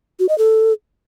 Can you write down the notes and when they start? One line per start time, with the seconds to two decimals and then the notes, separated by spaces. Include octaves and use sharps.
0.20 F#4
0.29 D#5
0.38 A4